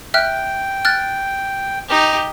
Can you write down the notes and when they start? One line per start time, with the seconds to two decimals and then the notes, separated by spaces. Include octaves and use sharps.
0.14 E5 G5 F6 F#6
0.85 F6 F#6 A6
1.89 D#4 G4